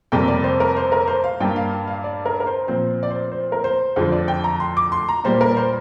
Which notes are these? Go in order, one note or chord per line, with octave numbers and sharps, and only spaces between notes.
F2 C3 G3 A#3 G5
D5
C5
A#4
C5
A#4
C5
F5
G2 G3 A#3 G5
F5
F5
D5
A#4
A#4
C5
A#2 F3 C4 C5
D5
C5
C5
A#4
C5
F2 D3 F3 C5
D5
G5
A#5
C6
D6
C6
A#5
A#2 G3 A#3 C5
A#4
C5